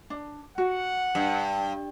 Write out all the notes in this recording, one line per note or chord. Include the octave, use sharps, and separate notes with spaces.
D4
F#4 F#5
G2